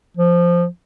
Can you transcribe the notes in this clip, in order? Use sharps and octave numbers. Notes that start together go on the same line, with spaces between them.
F3